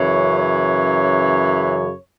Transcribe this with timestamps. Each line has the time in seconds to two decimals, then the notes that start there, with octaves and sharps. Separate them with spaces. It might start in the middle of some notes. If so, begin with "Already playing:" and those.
Already playing: F#2 C#3 E3 C#5
0.38 C#5